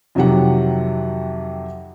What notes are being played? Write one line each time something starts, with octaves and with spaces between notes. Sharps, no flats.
F2 C3 D#3 F#3 G4 F#5